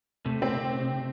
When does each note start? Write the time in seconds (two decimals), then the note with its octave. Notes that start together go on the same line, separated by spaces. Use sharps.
0.25 C3 A3
0.42 C4